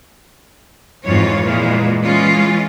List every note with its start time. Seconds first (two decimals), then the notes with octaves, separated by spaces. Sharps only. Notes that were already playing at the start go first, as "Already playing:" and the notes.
1.05 F2 G#2 E3 F4 C#5
1.44 A#2 E3 G#3
2.04 E3 G#3 C#4 F4